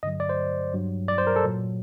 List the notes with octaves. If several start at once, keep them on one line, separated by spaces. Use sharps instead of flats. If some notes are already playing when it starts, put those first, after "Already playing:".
G2 D3 F#3 D#5
D5
C5
G2 F#3
D5
C5
A#4
A4
A#2 F#3